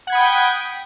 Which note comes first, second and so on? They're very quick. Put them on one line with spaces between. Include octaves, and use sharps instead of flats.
F#5 G#6 B5 D#6 G5